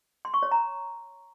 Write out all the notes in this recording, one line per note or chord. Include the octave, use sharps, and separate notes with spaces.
C6
C#6
C#5
A#5